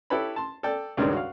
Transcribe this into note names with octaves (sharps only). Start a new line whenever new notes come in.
E4 G4 A4 B4 C#5 B5
A5 C6
A4 D5 G5
C#2 G2 D#3 G#3 D5
F#4 F5